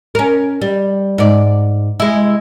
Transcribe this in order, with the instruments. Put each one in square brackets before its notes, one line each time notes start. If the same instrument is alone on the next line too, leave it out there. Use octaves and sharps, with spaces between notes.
[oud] C#4 A#4
G3
G#2 D5
G#3 E4